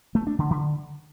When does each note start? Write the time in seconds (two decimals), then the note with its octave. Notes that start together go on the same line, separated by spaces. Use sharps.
0.15 A3
0.27 D4
0.39 D3
0.50 D3